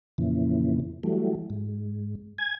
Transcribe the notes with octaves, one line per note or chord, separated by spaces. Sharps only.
F2 A#2 C#3 E3
E3 F#3 G3 A3
G#2
G#5 G#6